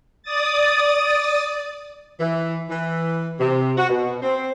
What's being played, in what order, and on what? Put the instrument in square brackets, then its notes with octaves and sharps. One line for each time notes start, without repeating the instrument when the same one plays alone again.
[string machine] D5 D#6 A6
[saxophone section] E3
E3
C3
F#4
B2
C4